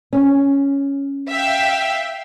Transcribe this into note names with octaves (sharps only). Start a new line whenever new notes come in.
C#4
E5 F5 G5